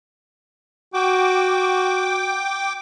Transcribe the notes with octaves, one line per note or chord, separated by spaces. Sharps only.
F#4 G5 D6